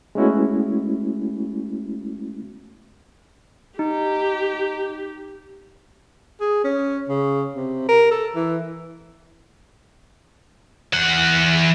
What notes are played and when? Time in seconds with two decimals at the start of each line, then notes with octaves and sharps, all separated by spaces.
0.15 G#3 A3 B3 C#4 E4 F#4
3.79 D#4 G4
6.41 G#4
6.64 C#4
7.09 C#3
7.55 C3
7.89 A#4
8.11 A4
8.35 E3
10.94 E3 F#5